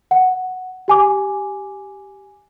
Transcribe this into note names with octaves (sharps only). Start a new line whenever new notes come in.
F#5
G4 G#5 D6